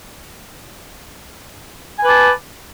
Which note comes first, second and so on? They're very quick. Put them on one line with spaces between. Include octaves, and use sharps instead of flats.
G#5 B4 D6 A5